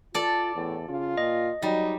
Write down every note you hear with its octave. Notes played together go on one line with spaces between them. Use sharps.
F4 A4 D5
E2 A2
C#3 F4
A#2 D#5
F#3 G3 D#4